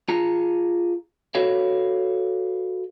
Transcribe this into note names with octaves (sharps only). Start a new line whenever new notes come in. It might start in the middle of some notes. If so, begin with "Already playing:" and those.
F4 G#4 A5 A#5
F#4 A4 B4 C#5 F5